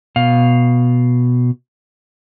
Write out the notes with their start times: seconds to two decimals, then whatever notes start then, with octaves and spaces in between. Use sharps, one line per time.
0.16 B2 F5